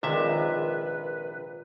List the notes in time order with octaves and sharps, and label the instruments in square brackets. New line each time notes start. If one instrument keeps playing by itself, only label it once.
[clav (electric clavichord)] A#1 C3 E5 [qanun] D#3 F3 G#3 [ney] B4